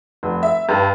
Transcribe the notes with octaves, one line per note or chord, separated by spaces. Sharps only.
F1
E5
G2